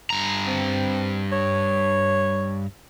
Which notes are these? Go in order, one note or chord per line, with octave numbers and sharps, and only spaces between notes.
G2 A#5
C4
C#5